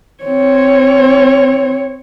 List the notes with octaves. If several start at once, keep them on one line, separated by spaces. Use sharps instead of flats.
C4 C#5